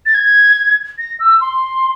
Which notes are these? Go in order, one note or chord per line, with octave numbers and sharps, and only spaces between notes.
A6
G#6
A#6
E6
C6